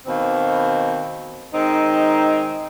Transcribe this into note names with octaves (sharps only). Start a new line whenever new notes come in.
B2 D#3 A#3 C4
D#3 G#3 C4 D#4